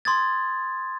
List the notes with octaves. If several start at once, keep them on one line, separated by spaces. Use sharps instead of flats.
C6 D#6 G#6 A6